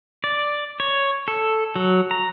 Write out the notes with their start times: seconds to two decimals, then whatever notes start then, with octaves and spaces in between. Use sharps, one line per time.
0.24 D5
0.80 C#5
1.28 A4
1.76 F#3
2.11 A#5